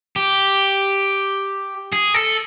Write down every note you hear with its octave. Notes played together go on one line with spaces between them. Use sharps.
G4
G#4
A4